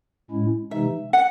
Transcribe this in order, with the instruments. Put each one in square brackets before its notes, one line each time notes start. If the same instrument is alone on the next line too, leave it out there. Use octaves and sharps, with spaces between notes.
[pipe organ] A2 G#3 C#4 E4
[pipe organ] C3 E3 G#3 D#4 [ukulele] E5
[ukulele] F#5